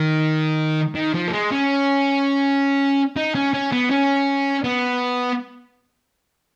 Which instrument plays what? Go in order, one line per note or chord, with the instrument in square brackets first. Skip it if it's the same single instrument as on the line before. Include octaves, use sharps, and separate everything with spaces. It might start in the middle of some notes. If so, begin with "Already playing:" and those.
Already playing: [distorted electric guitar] D#3
D#3
F3
A#3
G#3
C#4
D#4
C#4
C#4
B3
C#4
B3